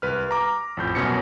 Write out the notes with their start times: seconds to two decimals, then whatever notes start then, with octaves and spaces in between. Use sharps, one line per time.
0.02 C2 B4 F6
0.31 A#5 D6
0.77 A1 F2 G6
0.95 C2 F#2 B2 C#4 A#6 C#7